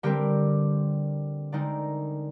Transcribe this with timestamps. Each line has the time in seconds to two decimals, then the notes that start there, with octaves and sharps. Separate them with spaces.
0.03 D3 G3 C4 G4 A#4
1.52 D3 G#3 C4 D#4 A#4 D5